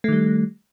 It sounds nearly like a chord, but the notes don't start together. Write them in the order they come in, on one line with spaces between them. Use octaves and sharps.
A3 D#3 G3